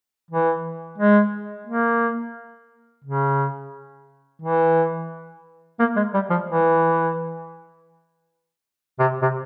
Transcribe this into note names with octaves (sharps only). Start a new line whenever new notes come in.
E3
G#3
A#3
C#3
E3
A#3
G#3
G3
F3
E3
C3
C3